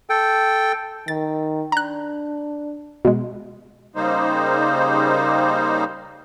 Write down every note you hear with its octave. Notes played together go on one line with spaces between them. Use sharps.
A4 G5
D#3 A6
D4 A#5 F#6
B2 G#3
C#3 G3 A#3 D#4 C5